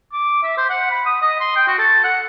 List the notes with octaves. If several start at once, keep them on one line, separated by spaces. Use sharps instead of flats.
D6
E5
C5
F#5
B5
D#6
D#5
C6
G5
F#4
A4
F#5